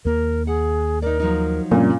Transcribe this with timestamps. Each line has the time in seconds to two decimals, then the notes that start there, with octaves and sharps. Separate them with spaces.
0.05 D#2 A#3 A#4
0.47 G#4 F#5
1.02 D#4 A#4 D5
1.20 F3 F#3 D#4
1.71 F#2 A#2 C#3 F3 G3 C4 D4